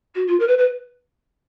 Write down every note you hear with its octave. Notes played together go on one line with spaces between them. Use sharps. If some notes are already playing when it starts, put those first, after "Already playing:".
F#4
F4
A#4
B4
B4